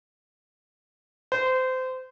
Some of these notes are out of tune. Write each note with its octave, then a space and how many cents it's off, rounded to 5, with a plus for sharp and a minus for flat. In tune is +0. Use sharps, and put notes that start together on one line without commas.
C5 -25